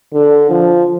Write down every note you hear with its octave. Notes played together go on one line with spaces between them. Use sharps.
D3
F3